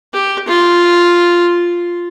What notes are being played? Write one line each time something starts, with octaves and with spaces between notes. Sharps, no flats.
G4
F4